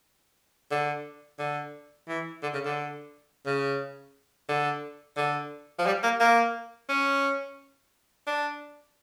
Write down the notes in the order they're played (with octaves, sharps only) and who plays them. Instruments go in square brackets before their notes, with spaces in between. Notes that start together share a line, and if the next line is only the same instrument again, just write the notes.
[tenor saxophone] D3
D3
E3
D3
C#3
D3
C#3
D3
D3
F3
G3
A#3
A#3
C#4
D4